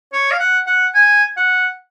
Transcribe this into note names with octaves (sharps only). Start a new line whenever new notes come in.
C#5
F5
F#5
F#5
G#5
F#5